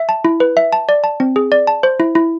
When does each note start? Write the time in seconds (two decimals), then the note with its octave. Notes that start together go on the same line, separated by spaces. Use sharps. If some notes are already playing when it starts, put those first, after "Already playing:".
Already playing: E5
0.09 A5
0.25 E4
0.40 B4
0.57 E5
0.73 A5
0.89 D5
1.04 A5
1.20 C4
1.36 G#4
1.52 D5
1.67 A5
1.83 C5
2.00 E4
2.15 E4